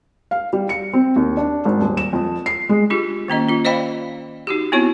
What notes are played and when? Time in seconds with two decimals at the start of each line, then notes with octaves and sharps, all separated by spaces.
0.31 F5
0.53 G3
0.69 C#7
0.93 C4
1.16 D#2
1.37 D4
1.65 G#1
1.81 D#1
1.97 E7
2.13 F2
2.46 C7
2.69 G#3
2.90 D4 F4 G4
3.28 D#3 A#3 C#4 D#5
3.49 C#4 F4
3.65 C5 D5 D#5 F5 G5 B5
4.47 D#4 F#4 G4
4.72 B3 C4 E4 F#4 C#5